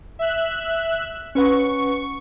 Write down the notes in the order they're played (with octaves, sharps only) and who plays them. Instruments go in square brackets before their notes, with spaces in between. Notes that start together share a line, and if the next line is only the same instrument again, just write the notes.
[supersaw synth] E5 F#6
[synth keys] C#4 B4 F#5 [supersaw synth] C#6